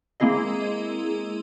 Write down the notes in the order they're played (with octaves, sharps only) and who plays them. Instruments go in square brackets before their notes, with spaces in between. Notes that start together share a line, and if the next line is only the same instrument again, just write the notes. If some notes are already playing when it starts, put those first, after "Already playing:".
[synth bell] G#3 A#3 C4 E4 G#4 D#5